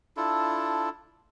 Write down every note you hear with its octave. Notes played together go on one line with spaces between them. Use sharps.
D4 E4 F4 A4